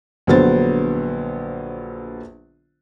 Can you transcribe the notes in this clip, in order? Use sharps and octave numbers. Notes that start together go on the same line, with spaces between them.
A#1 D3 F#3 B3 C5 A6